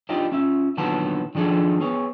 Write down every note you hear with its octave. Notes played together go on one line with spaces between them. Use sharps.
D4 D#4 F4 G4 D5 D#5
C#4 F4 E5
A#2 D3 D#3 F#3 B3 A5
D#3 F3 D4 G#4 A4
B3 G#4 C#5